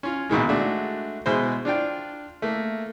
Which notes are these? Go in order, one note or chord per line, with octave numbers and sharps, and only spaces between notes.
C#4 F4
A#1 B2 D#3 G#3
G#3 A3 D4 F#4
B2 G#3 E4 C5
D4 F4 D5 G5
A3 A#3